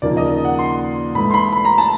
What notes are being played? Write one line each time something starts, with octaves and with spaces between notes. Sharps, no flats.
D#2 C#3 F3 A#3 D#4 D5
D#5
F#5
C6
G#2 E3 A3 B5
C6
B5
B5
A#5
A5